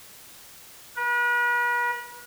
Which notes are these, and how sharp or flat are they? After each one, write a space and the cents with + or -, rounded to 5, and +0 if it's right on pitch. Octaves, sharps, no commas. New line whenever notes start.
B4 -40